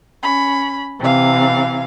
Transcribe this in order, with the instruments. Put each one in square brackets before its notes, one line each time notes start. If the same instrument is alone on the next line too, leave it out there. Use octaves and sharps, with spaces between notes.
[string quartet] C#4 B5
C3 E3 F5